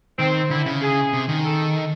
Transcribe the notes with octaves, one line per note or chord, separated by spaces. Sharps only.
D#3 C4
D3 E4
C#3
G#4
C3
D#3
A4